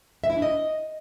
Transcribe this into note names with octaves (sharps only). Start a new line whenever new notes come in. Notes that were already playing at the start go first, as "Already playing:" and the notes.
E5
E4
D4
D#5